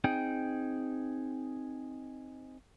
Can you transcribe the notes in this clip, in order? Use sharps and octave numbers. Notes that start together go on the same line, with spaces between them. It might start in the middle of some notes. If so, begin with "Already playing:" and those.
C4 D#4 G#4 G5